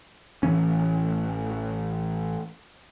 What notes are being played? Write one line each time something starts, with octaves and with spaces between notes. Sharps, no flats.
A1 C#3 E3 C#4